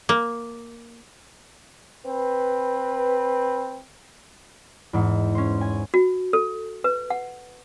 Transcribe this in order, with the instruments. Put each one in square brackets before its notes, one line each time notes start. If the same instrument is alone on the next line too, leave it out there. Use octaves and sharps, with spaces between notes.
[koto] A#3
[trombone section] C4 B4
[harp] E2 G#2
C#4 C5
G#5
[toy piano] F#4
A4
B4
F#5